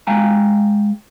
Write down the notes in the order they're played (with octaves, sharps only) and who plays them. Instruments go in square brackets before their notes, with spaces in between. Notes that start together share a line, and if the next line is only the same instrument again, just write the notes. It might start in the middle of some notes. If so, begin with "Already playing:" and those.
[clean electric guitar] G#3 F5 G5 G#5 A#5